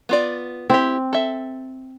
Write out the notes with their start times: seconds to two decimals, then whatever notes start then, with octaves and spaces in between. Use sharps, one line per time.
0.09 B3 F4 D5
0.70 C4 E4 G4
1.13 A4 E5